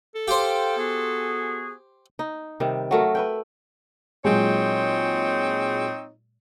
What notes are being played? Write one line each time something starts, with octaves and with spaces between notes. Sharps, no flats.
A4
G4 C5 F5 G5
B3 F#4 G#4
D#4
C3 D#3 G3
F#3 A3 A#4
B4 E5 G5
A#2 F#3 G#3 C4 D#4 C#5